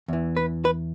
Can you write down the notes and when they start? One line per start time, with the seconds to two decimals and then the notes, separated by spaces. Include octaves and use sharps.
0.08 E2 E3
0.37 B4
0.65 B4